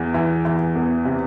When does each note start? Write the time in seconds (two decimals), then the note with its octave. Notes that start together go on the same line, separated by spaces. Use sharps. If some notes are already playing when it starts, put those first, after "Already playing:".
Already playing: E2 E3
0.14 E3
0.45 E3
0.76 E2
1.05 C3